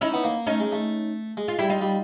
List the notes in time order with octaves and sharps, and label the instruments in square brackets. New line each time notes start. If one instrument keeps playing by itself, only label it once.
[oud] C#4 D#4 [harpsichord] E4
[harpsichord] B3
A#3
[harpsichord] A3 [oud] C#4 D#4
[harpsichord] G#3
A3
G#3
[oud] F4
[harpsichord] G3 [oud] E4
[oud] D#4 F4
[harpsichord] G3